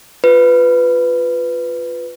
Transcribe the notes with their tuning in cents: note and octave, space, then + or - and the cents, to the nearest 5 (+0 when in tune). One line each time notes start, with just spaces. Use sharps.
F4 +5 B4 +10